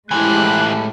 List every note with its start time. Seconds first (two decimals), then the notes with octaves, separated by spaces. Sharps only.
0.11 A2 E3 F3 G#3 E4 G4 G#5 F#6